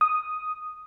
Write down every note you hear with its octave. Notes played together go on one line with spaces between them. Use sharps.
D#6